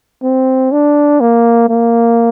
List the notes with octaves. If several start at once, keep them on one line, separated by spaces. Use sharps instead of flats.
C4
D4
A#3
A#3